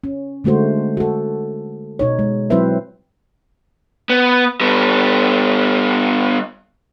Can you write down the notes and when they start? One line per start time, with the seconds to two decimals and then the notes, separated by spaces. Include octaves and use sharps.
0.04 C#4
0.44 D3 G#3 A3 F#4 C5
0.97 F#4 A4
1.99 B2 D#4 C#5
2.19 G#3
2.50 F#3 C4 E4 B4 C5 E5
4.10 B3
4.61 G3 B3